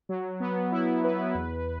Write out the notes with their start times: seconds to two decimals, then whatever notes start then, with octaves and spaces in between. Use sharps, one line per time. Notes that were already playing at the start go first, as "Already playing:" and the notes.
0.09 F#3
0.40 B3
0.72 E4
1.04 B4
1.34 E2